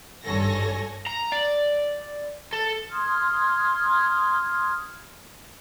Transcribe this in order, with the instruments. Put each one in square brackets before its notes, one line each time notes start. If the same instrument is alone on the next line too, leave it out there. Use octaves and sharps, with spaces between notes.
[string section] G#1 G2 A4 C#5 G#5 A#6
[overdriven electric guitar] A#5
D5
A4
[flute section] C6 D#6 F6 G#6